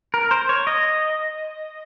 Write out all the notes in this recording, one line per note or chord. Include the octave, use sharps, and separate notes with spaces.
A#4
C5
C#5
D#5